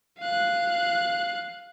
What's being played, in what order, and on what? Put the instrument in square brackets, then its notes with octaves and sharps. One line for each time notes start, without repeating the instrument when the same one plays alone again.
[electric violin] F5 F#6